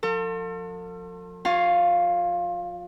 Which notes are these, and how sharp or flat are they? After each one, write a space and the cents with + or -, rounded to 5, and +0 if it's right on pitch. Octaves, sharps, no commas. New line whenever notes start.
F3 +35 A4 +40
F4 +30 C#5 +0 F5 +0